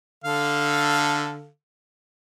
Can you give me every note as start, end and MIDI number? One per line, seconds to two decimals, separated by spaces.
0.24 1.48 50
0.24 1.48 69
0.24 1.48 77